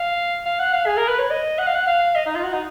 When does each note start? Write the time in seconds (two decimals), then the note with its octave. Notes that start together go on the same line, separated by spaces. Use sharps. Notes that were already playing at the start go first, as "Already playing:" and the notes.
Already playing: F5
0.46 F5
0.59 F#5
0.73 F5
0.86 G#4
0.97 A#4
1.08 B4
1.19 C#5
1.31 D#5
1.59 F#5
1.67 F5
1.75 F#5
1.87 F5
2.15 D#5
2.26 D#4
2.35 F4
2.44 F#4
2.53 D#4